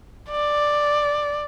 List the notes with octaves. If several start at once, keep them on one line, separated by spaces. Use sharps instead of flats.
D5